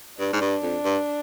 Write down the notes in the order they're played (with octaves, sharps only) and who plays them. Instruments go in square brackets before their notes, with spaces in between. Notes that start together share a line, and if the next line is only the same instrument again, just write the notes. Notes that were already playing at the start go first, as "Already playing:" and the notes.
[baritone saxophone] G2 [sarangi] D4
[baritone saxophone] G#2
G2
F2
G2